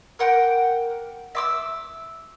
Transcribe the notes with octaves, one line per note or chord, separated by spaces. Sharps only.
A#4 F#5 G5 D6
E5 D6 E6